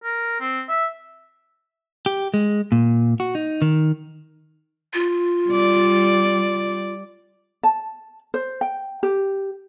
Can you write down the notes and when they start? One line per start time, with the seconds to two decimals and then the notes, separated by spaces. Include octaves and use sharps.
0.04 A#4
0.40 C4
0.69 E5
2.06 G4
2.34 G#3
2.72 A#2
3.20 F#4
3.35 D#4
3.62 D#3
4.93 F4
5.48 G3 D5
7.63 A5
8.34 C5
8.61 G5
9.03 G4